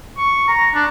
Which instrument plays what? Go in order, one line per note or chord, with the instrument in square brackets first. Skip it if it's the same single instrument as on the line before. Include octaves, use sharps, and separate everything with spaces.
[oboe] C#6
A#5
D4